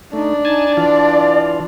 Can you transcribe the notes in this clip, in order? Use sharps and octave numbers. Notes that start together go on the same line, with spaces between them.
A3 D4 D#4
D#4 G#5 A5
E3 F4 D5